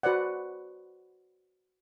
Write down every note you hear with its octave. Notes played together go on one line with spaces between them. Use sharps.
F#4 B4 C5 D5 F#5